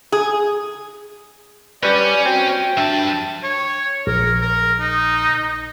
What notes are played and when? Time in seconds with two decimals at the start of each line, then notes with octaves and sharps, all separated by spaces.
0.12 G#4
1.83 G3 C#4 B4 D5
2.26 C4 F#4 G5
2.77 G2 D4 E5 A5
3.44 C#5
4.07 A#1 A#4
4.42 A#4
4.80 D#4